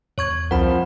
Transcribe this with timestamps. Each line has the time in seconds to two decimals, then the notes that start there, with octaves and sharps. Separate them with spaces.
0.18 E2 C#5 C#6 G#6
0.51 C2 F3 C4 A#4 F#5 B5